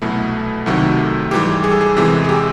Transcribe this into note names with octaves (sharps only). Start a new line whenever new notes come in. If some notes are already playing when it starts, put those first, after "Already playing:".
C2 B2 F#3 A3 E4
C2 C3 D#3 F#3 A3
G#2 E3 G3 G4
G#4
A4
G#4
E2 C3 E3 G#3
G#4
G4